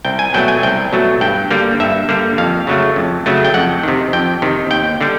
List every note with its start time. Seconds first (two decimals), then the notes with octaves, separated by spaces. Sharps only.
0.05 C2 G5
0.19 G#5
0.34 B2 F#3 A3 G5
0.48 G#5
0.63 C2 G5
0.93 B2 F#3 A3
1.21 G2 G5
1.51 D3 G3 A#3
1.80 G2 E5
2.09 D3 G3 A#3
2.38 F2 F5
2.67 C#3 F#3 A3
2.96 F2
3.26 C#3 F#3 A3
3.45 G5
3.54 F2 F#5
3.83 C3 D#3
4.13 F2 G5
4.42 C3 D#3
4.71 D#2 G5
5.01 D3 G3